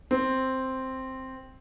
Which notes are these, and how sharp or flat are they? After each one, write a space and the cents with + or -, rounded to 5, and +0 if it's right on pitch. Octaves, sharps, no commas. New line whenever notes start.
C4 +0